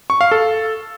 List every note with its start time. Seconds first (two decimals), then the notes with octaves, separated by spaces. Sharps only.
0.10 C#6
0.21 F5
0.31 A4